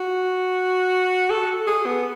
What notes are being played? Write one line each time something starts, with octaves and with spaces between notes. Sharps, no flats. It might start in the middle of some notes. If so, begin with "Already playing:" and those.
Already playing: F#4
A4
G#4
B3